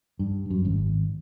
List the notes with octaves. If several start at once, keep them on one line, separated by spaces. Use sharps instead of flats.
G2
F#2
G#1